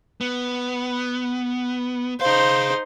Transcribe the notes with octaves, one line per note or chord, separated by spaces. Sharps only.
B3
D#4 G#4 C5 F5